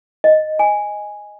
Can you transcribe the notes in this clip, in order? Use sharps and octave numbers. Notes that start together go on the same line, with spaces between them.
D#5
G#5